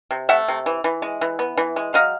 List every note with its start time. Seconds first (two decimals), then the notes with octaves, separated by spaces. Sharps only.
0.11 C3
0.29 A3 E5 F#5
0.48 C3
0.66 E3
0.84 E3
1.02 G#3
1.21 E3
1.39 B3
1.57 E3
1.76 G#3
1.94 F#3 D#5 F5